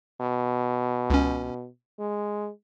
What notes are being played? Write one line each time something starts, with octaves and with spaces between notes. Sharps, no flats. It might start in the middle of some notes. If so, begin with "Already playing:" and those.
B2
C#2 C#4
G#3